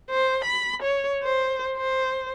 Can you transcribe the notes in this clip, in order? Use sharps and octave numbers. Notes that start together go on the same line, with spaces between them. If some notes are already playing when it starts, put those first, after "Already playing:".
C5
B5
C#5
C5
C5